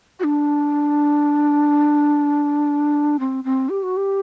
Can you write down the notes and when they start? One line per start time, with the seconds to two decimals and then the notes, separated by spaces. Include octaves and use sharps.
0.20 F#4
0.24 D4
3.20 C4
3.44 C4
3.69 G4
3.83 F#4
3.97 G4